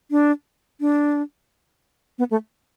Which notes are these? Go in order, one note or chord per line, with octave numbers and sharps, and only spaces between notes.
D4
D4
B3
A3